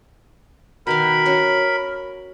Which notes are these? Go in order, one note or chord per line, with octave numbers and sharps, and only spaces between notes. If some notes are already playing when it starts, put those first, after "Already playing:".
B2 D#3 A#4 F5 B5
C#4 F#4